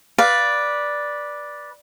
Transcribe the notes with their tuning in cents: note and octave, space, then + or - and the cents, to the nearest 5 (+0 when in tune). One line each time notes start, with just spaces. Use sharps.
B4 -15 D5 +0 F5 +0